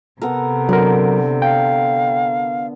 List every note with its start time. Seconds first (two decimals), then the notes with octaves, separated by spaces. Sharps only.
0.21 C3 B3 A4 A#4
0.69 D3 F#3 A#4
1.42 F5 G5